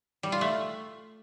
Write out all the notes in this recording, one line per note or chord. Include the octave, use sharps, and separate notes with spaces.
G3
F4
A3